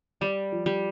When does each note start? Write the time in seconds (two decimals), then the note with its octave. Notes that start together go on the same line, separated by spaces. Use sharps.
0.21 G3 D5
0.52 F3
0.66 G3